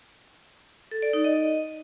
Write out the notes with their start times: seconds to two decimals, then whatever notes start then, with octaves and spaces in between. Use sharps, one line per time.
0.91 A4
1.02 D5
1.13 D#4
1.24 D#5